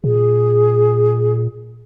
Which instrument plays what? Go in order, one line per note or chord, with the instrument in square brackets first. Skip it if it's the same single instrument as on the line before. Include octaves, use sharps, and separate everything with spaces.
[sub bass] A#2 [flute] G#4